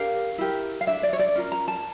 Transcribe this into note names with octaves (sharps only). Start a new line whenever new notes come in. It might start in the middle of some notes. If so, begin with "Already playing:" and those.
Already playing: D4 G4 A#4 F5
E4 G4 A#4
F5
D4 A4 E5
D5
C#5
D5
C#4 F4 A#4
A#5
A5